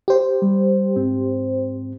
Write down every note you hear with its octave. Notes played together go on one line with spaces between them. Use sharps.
G4 C5
G3
G#2 C4